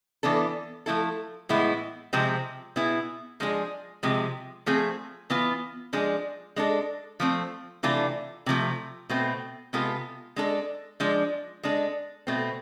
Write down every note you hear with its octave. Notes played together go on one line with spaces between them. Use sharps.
E3 B3 D4 A4
F3 A3 E4 A4
A2 E3 G#3 B3 E4
C3 F3 G#3 C4 G#4
B2 B3 E4 G#4
F3 G#3 D4 G#4
C3 F3 G#3
F3 A3 C4 G#4
E3 B3 F4
F3 G#3 D4 G#4
G#3 D4 A4
F3 A3 C4
C3 E3 A3 D4 F4
C3 F3 A3
B2 A3 C4
C3 G#3 B3 F4 A4
G#3 D4 A4
F3 G#3 D4
G#3 D4 A4
B2 A3 C4